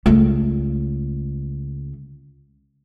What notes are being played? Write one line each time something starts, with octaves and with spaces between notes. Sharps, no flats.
C#2 A3